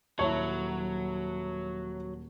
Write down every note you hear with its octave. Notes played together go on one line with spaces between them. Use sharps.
D#1 F#3 E4 C#5 A5